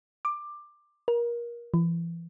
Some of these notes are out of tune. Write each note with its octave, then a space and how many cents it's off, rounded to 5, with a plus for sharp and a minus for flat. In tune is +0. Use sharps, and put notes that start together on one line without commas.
D6 +15
A#4 +25
E3 +35